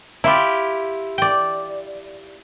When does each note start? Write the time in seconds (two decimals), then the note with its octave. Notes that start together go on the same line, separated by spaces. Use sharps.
0.24 E4 F4 G4
1.18 D5 G5